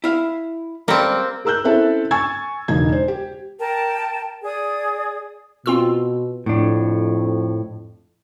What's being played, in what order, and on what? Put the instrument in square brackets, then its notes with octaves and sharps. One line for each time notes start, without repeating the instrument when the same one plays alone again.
[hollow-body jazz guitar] E4 F5
[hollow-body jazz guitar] G3 C#4 A4 [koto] A#3 C4
[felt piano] G#4 A#4 E6 F#6 G6
C4 C#4 E4 A4 E5 A5
G#5 C#6 E6 G#6 A6
E1 C#2 D#4 G#6
C5
G4
[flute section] A#4 G5 A5
G#4 D5 D#6
[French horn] B2 [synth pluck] C4 F4 E6
[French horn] F2 [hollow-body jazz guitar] A2 D4